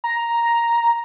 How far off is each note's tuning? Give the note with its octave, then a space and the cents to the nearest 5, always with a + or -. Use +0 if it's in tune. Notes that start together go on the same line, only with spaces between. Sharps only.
A#5 +5